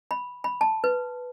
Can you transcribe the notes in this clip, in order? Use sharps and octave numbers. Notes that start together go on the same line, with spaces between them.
B5
B5
A5
B4